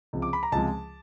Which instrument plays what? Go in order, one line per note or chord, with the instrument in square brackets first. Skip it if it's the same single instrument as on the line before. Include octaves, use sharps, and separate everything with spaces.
[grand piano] C#2 C3 F3
D6
B5
A#5
C#2 C3 F3 G#3 A5